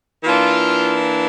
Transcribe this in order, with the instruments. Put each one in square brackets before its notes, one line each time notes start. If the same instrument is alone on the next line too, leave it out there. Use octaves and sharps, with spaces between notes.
[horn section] E3 A#3 D4 F4